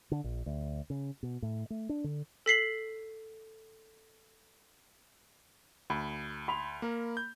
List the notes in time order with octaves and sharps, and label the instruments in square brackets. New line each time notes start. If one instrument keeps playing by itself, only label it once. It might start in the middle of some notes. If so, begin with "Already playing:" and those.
[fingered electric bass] D3
A#1
D2
C#3
B2
A2
A3
D4
D3
[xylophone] A4 B6 C7 F#7
[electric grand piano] D2 [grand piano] B5
[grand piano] B5 C6 F7
[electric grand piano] A#3 A#4
G6